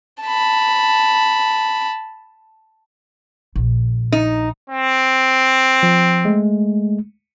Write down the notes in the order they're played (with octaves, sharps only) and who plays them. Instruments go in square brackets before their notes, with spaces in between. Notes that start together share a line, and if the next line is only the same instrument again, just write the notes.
[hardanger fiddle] A5 B5
[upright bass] A#1
[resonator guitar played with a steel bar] D#4
[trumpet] C4
[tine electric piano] F3
G#3 A3